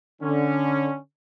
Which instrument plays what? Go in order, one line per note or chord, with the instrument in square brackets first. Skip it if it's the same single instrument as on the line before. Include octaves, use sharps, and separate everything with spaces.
[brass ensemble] D3 C#4